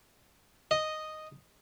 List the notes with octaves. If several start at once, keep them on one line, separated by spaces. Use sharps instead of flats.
D#5